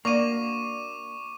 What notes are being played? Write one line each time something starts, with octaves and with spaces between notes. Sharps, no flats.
A#3 D4 F#4 C#6 D6 D#7